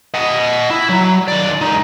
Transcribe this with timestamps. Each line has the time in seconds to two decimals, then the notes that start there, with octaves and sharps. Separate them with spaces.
0.14 D#5 F#5
0.70 E4
0.89 F#3
1.28 D#3 D5
1.61 C#2 D#4